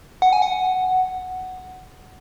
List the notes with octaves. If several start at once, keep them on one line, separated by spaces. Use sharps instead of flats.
F#5
G#5
F#5